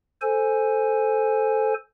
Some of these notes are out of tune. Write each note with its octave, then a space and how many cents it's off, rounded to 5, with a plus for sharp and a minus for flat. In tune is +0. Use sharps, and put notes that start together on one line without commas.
A4 +0 C5 +0 G#5 +0